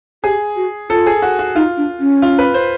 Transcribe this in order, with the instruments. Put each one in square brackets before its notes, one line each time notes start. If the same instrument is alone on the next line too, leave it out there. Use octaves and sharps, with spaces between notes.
[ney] G4 [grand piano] G#4
[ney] F#4
[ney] F4 [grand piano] A4
[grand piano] G#4
F#4
F#4
[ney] D#4 [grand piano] F4
[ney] D4
C#4
[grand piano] F4
B4
C5